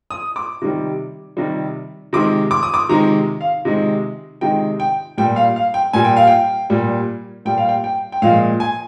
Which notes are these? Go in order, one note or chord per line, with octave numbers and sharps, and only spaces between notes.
D#6
D6
C3 D#3 G3
C3 D#3 G3
C3 D#3 G#3 D6
D6
D#6
D6
C3 D#3 G#3 A#5
F5
C3 D#3 G#3
C3 D#3 G#3 G5
G5
A#2 G3 G5
F5
F5
G5
A#2 G3 G#5
G5
F5
G5
A#2 G3
A#2 G3 G5
F5
G5
G5
G5
A#2 F3 G#3 F5
G#5